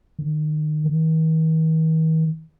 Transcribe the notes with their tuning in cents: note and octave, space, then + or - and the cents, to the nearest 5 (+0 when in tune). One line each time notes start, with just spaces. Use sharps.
D#3 -30
D#3 +45